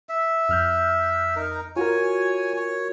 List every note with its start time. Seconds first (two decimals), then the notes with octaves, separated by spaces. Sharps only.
0.09 E5
0.49 F2 F6 G6
1.36 D#4 A#4
1.76 F4 F#4 A#4 C#5 G#5
2.56 C#5